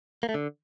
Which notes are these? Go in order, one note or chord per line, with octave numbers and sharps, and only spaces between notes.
A#3
A3
D3